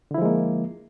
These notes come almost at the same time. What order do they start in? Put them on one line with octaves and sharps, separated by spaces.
D3 E4 F3 G#3 A#3